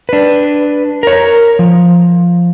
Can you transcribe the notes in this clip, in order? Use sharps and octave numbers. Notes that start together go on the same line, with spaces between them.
D4 B4
A#4 C#5
F3